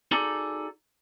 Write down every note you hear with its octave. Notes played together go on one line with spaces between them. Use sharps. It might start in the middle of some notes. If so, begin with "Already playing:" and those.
D#4 F#4 G#4 A4 D5 A#5